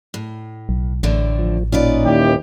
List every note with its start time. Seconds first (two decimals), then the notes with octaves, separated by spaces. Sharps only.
0.14 A2
0.69 B1
1.03 A1 A2 D3 A3
1.39 F3
1.72 A#2 C#4 D#4 F4 B4 D5
2.04 D#2 E3 G4